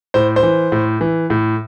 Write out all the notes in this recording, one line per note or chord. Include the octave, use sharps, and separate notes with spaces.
A2 C5
C5
E3
A2
E3
A2